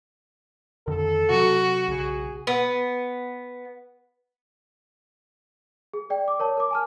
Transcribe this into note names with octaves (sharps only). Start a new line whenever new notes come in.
F2 D3 D#3 A4
C3 F#3 F#4
B1 C#3 G#4
B3
G#4
D5 G5
D6
A#4 C#5 A5
A#4 D6
G#5 A5 F6